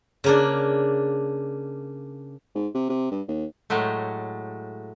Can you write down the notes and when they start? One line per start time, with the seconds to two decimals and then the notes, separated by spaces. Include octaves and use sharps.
0.24 C#3 A#3 D4
2.55 G#2
2.75 C3
2.89 C3
3.11 G2
3.28 D#2
3.70 A2 F#3 G#3 A3